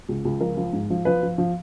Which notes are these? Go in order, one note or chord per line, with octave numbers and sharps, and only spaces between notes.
C#2
C#2
F3 A#4
F3
G#2
F3
F3 B4
F3
F3